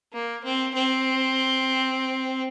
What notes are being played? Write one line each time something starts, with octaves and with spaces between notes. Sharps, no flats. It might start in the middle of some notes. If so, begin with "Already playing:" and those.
A#3
C4
C4